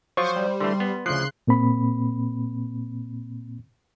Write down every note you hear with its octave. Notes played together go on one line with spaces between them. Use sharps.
F3 F#3 F4 C5 C#6
G3
D3 E3 A3 C6
B3
D2 C#3 F3 C6 F#6 C7
A#2 A#3 C4 B5